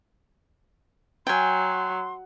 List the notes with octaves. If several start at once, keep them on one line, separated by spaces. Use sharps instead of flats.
F#3 G5 G#5 C6